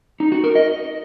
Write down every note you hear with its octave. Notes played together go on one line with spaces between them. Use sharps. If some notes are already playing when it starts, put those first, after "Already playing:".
D#4
F#4
A#4
D#5